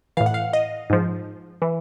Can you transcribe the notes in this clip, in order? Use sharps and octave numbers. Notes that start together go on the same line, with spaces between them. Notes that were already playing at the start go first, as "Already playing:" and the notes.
A2 E3 F5
F#5
F5
D#5
G#2 F3
E3